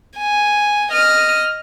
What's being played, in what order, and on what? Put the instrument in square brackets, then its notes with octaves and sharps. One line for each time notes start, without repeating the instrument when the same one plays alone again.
[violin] G#5
D#5 F6